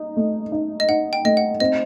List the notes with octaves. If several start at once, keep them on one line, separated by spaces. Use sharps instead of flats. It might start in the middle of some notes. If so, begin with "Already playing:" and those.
Already playing: D#4
A3
D#4
D#5
D#4 F#5
G5
A3 D#5
F#5
C4 D#5